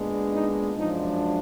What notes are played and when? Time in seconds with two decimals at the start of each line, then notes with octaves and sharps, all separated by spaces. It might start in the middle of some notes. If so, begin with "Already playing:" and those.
Already playing: A#2 G#3 B3 D4
0.31 D#4
0.76 F#2 F3 G#3 D4 D#4